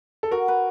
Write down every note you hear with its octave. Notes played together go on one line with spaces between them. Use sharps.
A4
F#4 A#4
B4